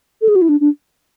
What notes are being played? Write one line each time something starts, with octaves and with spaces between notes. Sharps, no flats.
A4
G#4
F#4
E4
D4
D4